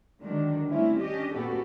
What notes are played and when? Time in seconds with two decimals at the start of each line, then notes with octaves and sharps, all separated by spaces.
0.20 D3 D#3 F#3 G#3 D4
0.68 G3 A3 C4 C#4 E4
0.98 C#4 D4 G4 D#5
1.33 A#2 B3 C#4 F#4 G4 A4